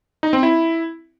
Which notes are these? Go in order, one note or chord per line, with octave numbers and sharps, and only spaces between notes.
D#4
C4
E4